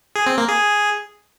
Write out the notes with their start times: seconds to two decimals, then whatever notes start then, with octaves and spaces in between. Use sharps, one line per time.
0.16 G#4
0.27 C4
0.38 A#3
0.49 G#4